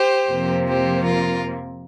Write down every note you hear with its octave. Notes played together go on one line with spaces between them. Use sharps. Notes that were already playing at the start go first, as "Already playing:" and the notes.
Already playing: G4 C5
F2 C3 F3 A#3
G4 C5
F4 A#4